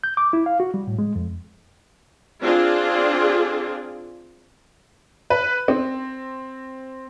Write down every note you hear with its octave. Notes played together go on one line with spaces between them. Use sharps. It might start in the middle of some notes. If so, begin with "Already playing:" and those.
G6
D6
E4
F5
F#4
G3
A2
G#3
F2
C4 D4 F4 G#4
B4
C4